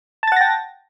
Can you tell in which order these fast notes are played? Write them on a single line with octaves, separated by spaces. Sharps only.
A5 A6 F#5 A#6 G5